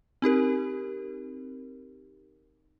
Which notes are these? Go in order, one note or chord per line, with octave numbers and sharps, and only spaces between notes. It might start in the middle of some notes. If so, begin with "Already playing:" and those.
C4 D#4 G4 A#4